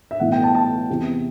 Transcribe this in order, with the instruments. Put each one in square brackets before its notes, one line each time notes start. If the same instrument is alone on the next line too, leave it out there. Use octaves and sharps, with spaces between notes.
[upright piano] E5
B1 A2 E3 F#5
G5
A5
A5
E2 C3 E3